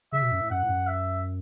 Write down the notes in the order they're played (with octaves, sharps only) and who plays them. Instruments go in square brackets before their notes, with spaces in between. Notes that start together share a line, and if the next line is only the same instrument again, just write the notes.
[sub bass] C#3 [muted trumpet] E5
[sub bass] B2
F#2
A2
[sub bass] F#2 [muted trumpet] F#5
[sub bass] A2
F#2
[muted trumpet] E5